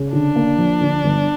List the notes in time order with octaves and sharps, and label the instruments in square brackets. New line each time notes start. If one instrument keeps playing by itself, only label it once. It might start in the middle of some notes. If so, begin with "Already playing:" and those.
Already playing: [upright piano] C#3
[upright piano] D3 [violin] D4
[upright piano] A#3
F3
D3
G1